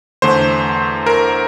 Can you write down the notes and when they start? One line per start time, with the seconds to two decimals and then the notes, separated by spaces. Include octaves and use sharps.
0.22 E2 D3 A3 C5
1.06 A#4